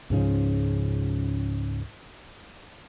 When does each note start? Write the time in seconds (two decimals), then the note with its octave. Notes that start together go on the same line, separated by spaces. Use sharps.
0.10 C#2 G#2 C#3 F3